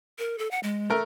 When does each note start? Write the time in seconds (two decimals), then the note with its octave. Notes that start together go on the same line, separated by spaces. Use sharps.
0.19 A#4
0.38 A4
0.51 F#5
0.63 G#3
0.90 A3 A#4